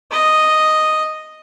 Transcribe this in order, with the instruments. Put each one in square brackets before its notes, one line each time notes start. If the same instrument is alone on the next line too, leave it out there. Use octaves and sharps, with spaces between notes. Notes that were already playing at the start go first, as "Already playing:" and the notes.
[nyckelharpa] D#5